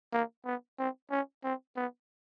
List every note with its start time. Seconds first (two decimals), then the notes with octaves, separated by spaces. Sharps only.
0.13 A#3
0.45 B3
0.79 C4
1.11 C#4
1.44 C4
1.76 B3